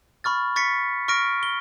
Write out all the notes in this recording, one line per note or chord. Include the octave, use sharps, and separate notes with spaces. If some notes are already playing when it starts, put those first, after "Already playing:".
B5 C#6 F6 A6
C#6 A6 B6 C#7
C#6 F6 A#6 D7
G7